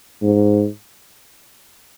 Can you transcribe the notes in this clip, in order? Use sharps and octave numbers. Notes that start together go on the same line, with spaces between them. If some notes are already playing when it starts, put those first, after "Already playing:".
G#2